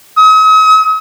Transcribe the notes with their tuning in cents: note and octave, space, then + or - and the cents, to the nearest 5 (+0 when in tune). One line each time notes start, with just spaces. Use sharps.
D#6 +45